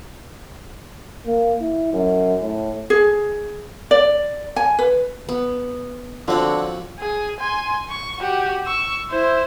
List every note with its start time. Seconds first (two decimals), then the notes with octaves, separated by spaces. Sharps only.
1.26 A#3
1.61 E4
1.93 F#2
2.42 A2
2.90 G#4
3.91 D5
4.56 G#5
4.79 B4
5.29 B3
6.28 D3 F3 C4 F4 F#4 C#5 F#5
7.00 G#4
7.40 G#5 C6
7.89 C#6
8.19 F#4 G4
8.66 C#6 E6
9.10 E4 C5